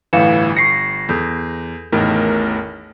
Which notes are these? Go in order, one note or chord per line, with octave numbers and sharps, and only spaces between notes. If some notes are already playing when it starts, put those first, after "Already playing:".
G1 A2 E3 F5 C#7 E7
C#6 A#6 C7 C#7
E2 A4 G6
A1 E2 A2 D#3 A#4